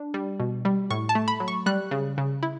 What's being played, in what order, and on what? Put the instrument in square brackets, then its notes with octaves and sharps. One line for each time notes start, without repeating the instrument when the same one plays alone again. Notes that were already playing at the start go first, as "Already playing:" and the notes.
Already playing: [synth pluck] D4
G3
B2
G3
A2 C#6
A5
A3
B5
F#3
C#6
G3 F#6
C#3
C#3
E4